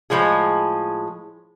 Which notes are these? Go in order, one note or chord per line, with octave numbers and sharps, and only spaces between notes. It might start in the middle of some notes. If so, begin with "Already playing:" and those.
A2 F3 G#3 G#4